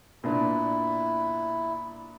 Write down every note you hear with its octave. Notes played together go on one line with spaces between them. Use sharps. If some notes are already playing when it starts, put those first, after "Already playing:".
A#2 B3 D4 E4